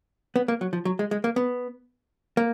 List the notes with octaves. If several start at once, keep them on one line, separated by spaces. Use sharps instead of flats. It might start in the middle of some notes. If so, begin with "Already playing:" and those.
B3
A#3
F#3
F3
F#3
G#3
G#3
A#3
B3
A#3